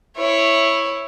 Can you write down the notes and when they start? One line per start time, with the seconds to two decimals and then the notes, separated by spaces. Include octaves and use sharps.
0.17 E4 C#5